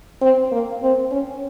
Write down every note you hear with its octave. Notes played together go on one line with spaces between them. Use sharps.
C4
A#3
C4
C#4